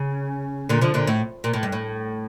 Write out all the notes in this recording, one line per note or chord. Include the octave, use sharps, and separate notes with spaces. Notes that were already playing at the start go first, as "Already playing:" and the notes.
Already playing: C#3
A#2 D3
D3 F3
A#2 D3
A2
A#2
A2
G2
A2